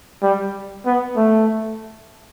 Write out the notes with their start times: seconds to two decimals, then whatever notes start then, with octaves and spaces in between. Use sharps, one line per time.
0.23 G3
0.86 B3
1.16 A3